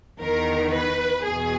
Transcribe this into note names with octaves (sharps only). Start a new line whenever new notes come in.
E2 D#3 A#4
B4
E2 B2 G#4